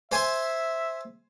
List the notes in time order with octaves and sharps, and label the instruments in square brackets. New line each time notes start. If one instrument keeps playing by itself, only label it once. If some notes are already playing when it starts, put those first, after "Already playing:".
[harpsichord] C5 G#5 C6 [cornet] E5